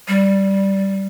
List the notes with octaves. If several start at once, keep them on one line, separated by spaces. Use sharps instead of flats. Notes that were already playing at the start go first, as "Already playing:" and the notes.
G3